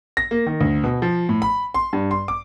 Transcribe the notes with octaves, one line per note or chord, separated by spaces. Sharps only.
A#6
A#3
D#3
D2
B2
F3
A2
B5
C6
G2
C6
D6